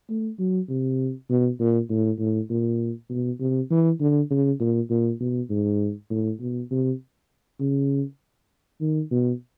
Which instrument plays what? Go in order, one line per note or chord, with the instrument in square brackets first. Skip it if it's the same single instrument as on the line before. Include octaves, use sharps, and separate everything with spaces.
[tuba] A3
F#3
C3
B2
A#2
A2
A2
A#2
B2
C3
E3
D3
C#3
A#2
A#2
B2
G#2
A2
B2
C3
C#3
D#3
B2